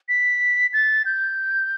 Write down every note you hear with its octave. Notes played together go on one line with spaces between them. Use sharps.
B6
A6
G6